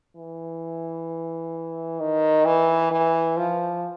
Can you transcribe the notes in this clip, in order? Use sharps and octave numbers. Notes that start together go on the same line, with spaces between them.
E3
D#3
E3
E3
F3